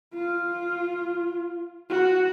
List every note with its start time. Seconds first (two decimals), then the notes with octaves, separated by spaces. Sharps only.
0.14 F4
1.90 F#4